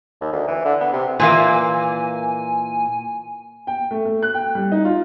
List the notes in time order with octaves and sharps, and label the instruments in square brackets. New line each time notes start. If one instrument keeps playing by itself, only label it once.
[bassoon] D#2
D2
E3
D3
B3
C3
[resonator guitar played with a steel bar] A#2 E3 A#3 [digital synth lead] G#5
[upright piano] G5
A3
A3
F#6
G5
G3
D#4
F4